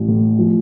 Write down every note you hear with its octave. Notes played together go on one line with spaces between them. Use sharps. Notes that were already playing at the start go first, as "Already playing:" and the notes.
Already playing: A1
A2
F3